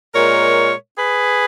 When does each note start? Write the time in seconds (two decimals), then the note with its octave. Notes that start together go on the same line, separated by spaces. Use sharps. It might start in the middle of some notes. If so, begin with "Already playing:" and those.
0.14 A#2 G#3 A#4 C#5
0.97 G#4 B4